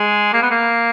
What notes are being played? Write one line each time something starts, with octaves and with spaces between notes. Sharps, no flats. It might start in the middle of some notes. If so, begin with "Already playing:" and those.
Already playing: G#3
A#3
B3
A#3